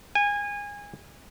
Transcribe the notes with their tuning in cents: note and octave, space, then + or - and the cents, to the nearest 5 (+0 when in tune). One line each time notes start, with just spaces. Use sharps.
G#5 -25